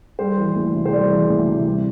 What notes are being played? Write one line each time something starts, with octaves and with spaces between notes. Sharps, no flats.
G3 C5
E3
D2
C3
C5
G3 D5
E3
D2
C3
G3